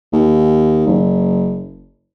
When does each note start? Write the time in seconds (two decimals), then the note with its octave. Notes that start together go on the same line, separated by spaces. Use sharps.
0.13 D#2
0.87 F#1